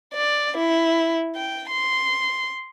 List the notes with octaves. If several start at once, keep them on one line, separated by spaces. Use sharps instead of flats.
D5
E4
G5
C6